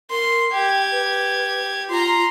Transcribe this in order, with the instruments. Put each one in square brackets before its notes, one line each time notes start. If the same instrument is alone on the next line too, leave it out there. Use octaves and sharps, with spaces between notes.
[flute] A#4 [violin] C6
[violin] G4 G#6 [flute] G5
[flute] B4
[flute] F4 [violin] A#5 C6